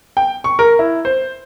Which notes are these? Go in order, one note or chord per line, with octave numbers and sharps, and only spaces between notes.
G5
C#6
A#4
E4
C5